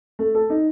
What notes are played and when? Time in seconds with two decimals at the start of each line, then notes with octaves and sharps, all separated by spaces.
0.19 A3
0.35 A4
0.50 D#4